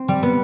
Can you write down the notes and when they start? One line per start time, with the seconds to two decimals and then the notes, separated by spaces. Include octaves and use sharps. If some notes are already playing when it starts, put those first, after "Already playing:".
Already playing: C4
0.08 G3
0.23 B3